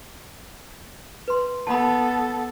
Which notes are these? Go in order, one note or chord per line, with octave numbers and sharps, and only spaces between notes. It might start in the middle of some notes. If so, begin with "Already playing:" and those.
B4 C6
B3 A4 A5 B5